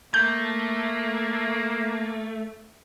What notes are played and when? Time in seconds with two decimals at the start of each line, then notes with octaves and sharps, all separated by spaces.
0.14 A3 A#3 G6